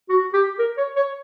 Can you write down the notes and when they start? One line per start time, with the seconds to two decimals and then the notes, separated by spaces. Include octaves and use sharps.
0.09 F#4
0.33 G4
0.59 A#4
0.77 C#5
0.96 C#5